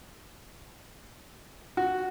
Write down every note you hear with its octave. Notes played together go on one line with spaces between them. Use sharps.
F#4